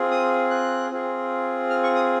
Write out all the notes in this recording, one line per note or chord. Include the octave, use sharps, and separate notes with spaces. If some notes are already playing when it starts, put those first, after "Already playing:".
Already playing: C4 F4 G#4
D#6
F#6
C4 F4 G#4
F6
C#6
D#6